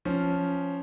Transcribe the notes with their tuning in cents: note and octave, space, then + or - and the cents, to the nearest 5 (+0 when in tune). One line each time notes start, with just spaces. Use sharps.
F3 -5 C#4 +0